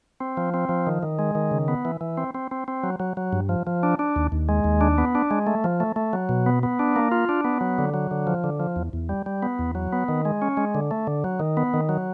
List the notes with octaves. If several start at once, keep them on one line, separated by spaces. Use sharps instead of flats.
C4
F3
C4
F3
D#3
D#3
G#3
D#3
C#3
B3
E3
E3
C4
C4
C4
C4
F#3
F#3
F#3
G2
F3
F3
D4
D4
D#2
D#2
G#3
D#2
D4
B3
D4
G#3
A3
F3
A3
A3
F#3
B2
B3
B3
D4
A#3
F4
D4
B3
F#3
D3
F#3
D3
F3
D3
F3
E2
E2
G3
G3
B3
E2
F#3
B3
D#3
G#3
C#4
G#3
D3
A3
D3
F#3
D#3
B3
D#3
F#3